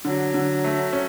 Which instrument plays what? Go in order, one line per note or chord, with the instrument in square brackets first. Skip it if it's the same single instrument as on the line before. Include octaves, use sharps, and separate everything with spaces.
[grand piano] D3 [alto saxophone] F#3
[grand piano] D3
A3
C#4